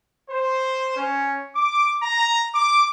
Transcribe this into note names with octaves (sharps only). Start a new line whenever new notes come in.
C5
C#4
D6
A#5
D6